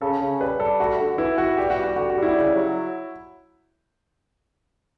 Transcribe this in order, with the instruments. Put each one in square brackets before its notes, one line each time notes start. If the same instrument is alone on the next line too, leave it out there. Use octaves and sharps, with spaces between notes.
[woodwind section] C#3 [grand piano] A4
[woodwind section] C#3
[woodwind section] G3 [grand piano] B4
[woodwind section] G3 [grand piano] A4
[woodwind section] A3 [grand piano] F#4
[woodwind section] D3
[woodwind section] E3 [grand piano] E4
[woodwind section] E3 [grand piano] F#4
[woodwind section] G3 [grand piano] G4
[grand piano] F#4
[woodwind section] G3
[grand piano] F#4
[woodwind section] D3 [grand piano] F#4
[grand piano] F#4
[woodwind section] G3
[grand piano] E4
[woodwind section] C#3
F#3